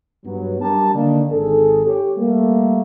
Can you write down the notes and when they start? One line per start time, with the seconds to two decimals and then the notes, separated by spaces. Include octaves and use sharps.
0.25 G2 F#3 B3
0.60 G3 D4 G4 A#4 A5
0.94 D3 D#3 A#3 D4
1.30 G#1 G#4 A4
1.85 G4 C#5
2.16 G3 A3 A#3